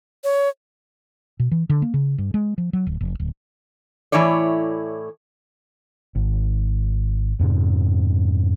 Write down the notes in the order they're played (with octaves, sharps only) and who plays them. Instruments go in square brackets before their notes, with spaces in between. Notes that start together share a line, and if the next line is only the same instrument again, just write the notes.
[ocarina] C#5
[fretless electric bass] B2
E3
D3
A#3
C#3
G2
G#3
F3
F#3
D1
F1
D1
[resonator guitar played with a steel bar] A2 E3 E4 C#5 D5
[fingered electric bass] G#1
F2 G#2 C3